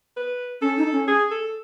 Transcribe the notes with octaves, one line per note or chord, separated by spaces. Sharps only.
B4
C#4 A4
D#4
C#4
G#4
A4